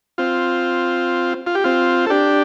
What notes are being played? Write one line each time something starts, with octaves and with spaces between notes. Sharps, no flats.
C4 F4
F4
G4
C4 F4
A4
D4 G4